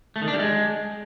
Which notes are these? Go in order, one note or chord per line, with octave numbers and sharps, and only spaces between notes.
A3
D#3
D4
G3
G#3